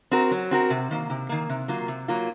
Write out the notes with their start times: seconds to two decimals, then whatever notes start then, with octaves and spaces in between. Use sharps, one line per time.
0.11 C4 F#4 A#4
0.31 F#3
0.51 C4 F#4 A#4
0.70 C3
0.91 D#3 A#3
1.10 C3
1.29 D#3 A#3
1.49 C3
1.68 F#3 A#3 F4
1.88 C3
2.08 F#3 A#3 F4